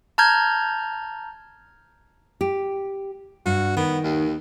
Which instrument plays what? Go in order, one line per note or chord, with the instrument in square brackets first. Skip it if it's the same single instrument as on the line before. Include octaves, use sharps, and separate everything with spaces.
[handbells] A5 A#5 F6 G6 G#6
[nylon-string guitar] G4
[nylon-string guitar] G2 [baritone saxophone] F#4
[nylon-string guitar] D#3 [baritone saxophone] B3
[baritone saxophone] D#2